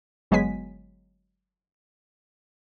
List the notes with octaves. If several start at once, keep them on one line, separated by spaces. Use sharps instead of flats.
G1 F#3 G#3 B3 G#5 B6